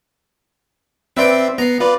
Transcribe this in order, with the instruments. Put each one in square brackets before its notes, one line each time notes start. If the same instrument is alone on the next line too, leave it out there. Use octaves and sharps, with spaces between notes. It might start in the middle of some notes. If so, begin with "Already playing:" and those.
[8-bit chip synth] C4 E5 C6 [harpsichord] B4 D5 G5
[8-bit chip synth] B3 C7 [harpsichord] A#5
[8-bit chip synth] F4 B4 D5